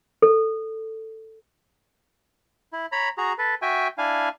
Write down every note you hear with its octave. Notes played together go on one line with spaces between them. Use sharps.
A4
E4
C#5 A#5 B5
F#4 G#4 A#5
A4 B4
F#4 E5 G5 G#5
D4 E4 F5 G#5